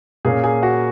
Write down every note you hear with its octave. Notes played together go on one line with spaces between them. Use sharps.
A#2 A#3 C#4 G#4 G#5
G#4 G#5
F#4 F#5